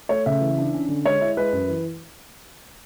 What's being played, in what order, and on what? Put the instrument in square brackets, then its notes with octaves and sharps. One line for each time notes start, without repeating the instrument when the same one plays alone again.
[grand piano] A3 C#5
C#3 E5
E3
D4
C#4
D3
G#3 C#5
E4
G#3 B4
F#2
E3